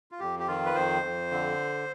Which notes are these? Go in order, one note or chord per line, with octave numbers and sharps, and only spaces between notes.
F4
F2 G4
G4
D#3 F4
B4
F2 C5
F2
D3